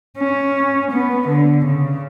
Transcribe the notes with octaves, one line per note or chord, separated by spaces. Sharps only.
C#4
B3
D3
C#3